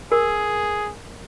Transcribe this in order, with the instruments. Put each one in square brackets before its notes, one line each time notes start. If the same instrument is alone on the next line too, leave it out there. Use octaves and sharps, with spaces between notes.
[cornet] G#4 [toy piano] A#4